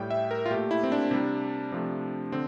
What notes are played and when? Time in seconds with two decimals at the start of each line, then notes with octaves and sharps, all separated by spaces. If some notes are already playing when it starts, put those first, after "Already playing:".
Already playing: A2 G3 G5
0.11 E5
0.31 A#4
0.46 F4
0.51 A#2 A3 G4
0.71 E4
0.83 C4
0.92 D4
1.11 C3 G3
1.72 C3 F3 A3
2.32 D3 C4